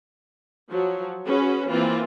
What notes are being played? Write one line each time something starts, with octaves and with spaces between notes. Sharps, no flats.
F3 F#3
C#4 F#4 G#4 B4
E3 A#3 C4 F4